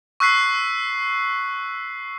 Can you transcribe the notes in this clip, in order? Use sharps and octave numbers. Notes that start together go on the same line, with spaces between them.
C#6 E6 F#6 B6 C7